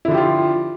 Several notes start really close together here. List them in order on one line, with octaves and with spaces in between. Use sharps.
E4 D3 F3 G4 F4